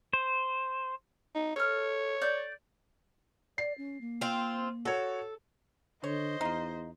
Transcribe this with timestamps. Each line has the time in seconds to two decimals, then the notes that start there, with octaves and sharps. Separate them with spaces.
0.13 C5
1.35 D#4
1.56 A4 C#5 F6
2.21 D5 G6
3.58 D5 C7
3.78 C#4
4.01 A#3
4.21 C4 F4
4.85 F#4 A4 C#5
6.04 D3 C5 C#5 D#5
6.41 E2 D#4 F4